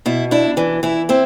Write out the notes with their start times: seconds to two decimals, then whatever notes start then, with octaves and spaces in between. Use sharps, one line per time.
0.06 B2 E4
0.31 D4 E4
0.57 E3 D4
0.83 E3 E4
1.09 C4 E4